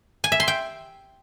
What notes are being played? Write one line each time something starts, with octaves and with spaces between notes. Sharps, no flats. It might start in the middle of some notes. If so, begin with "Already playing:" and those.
G#5
E5
C6
G5